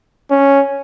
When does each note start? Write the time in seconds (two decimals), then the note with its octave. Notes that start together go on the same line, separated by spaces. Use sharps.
0.31 C#4